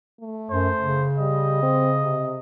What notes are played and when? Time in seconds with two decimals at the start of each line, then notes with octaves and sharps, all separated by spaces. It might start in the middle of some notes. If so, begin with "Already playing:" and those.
0.21 A3
0.51 F#2 C5
0.81 C#3
1.18 G3 D#5
1.62 C4
2.01 C3